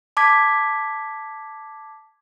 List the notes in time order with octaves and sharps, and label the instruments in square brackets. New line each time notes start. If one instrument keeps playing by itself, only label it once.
[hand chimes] A5 D6 G#6 B6